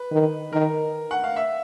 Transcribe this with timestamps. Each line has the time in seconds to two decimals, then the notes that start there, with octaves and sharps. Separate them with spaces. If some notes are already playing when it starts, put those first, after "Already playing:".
Already playing: B4
0.12 D#3
0.53 D#3 A#4
1.11 F#5
1.24 F5
1.36 E5